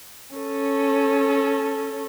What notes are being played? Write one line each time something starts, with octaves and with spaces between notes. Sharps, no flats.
C#4 A4